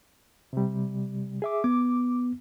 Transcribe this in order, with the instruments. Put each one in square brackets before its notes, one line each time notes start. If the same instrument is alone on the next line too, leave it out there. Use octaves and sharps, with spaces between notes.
[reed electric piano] C3 G3
G#4 E5 D6
[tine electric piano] B3 [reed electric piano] D6